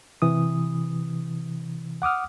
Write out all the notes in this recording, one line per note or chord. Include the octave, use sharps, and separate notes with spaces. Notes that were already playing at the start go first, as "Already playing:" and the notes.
C3 E3 D#6
F#5 D6 D#6 F6